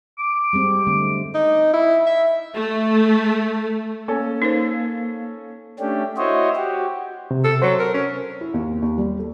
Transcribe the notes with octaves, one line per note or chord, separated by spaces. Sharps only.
D6
G3 G#3 C4
D3 A3 C4
D#4
E4
E5
A3
A#3 C#4 A4
D#4 A#4 C5
A3 C#4 D4 G4
E4 F#4 C5 C#5 D#5
F#4 G4
C3
A4
F#3 C5
A#4
C#4
E4
D#2
D#2
G3
A4